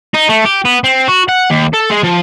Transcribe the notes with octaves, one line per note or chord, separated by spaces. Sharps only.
D#4
A3
G4
B3
C4
F#4
F#5
D#2
A4
G#3
F3